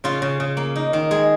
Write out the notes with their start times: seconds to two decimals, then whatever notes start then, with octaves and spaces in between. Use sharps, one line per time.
0.04 C#3 F4
0.22 C#3
0.40 C#3
0.57 A#3
0.76 D#4
0.93 D#3
1.11 G#3 G#4